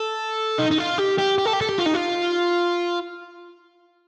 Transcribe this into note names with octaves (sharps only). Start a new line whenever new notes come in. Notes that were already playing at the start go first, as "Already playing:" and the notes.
Already playing: A4
D#4
D#4
F4
G4
G4
G4
A4
G4
A4
G4
F4
D#4
F4